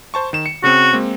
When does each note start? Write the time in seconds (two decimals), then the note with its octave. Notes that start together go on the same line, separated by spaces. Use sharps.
0.14 C5 A5 C#6
0.33 D#3 E7
0.46 C#7
0.64 C#3 C4 F#4
0.93 G#3 A#3 C4